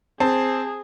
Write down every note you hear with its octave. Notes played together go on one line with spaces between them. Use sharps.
C4 G#4 A5